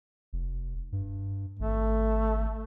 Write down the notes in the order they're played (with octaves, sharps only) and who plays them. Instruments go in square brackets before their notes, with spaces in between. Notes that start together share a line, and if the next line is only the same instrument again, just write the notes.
[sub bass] F1
G2
[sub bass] G#1 [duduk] A3